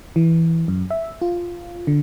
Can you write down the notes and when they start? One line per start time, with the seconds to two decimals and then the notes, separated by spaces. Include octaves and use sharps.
0.16 E3
0.68 F#2
0.91 E5
1.22 F4
1.87 D3